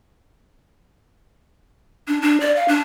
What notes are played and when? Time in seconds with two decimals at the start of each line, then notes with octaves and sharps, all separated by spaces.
2.08 D4
2.22 D4
2.40 D5
2.56 F5
2.68 D4